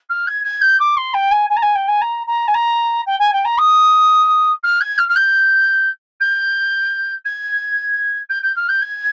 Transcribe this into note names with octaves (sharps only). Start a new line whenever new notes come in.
F6
G#6
G#6
G6
D6
C6
G5
G#5
G#5
A#5
G#5
G5
G#5
A#5
A#5
G#5
A#5
G5
G#5
G5
A#5
D#6
F6
G#6
F6
F6
G6
G6
G#6
G6
G6
F6
G6
G#6